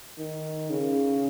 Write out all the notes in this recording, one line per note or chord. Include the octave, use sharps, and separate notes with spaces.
D#3
C#3